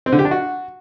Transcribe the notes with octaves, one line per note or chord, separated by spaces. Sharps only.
C4
D3
G4
D4
F#4